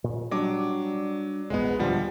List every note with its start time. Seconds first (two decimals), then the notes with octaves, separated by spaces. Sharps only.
0.04 A#2
0.31 F#3 G3 D4 D6
1.50 A#1 E2 G#2 G#3 B3
1.79 D2 A#2 D3 F3 G3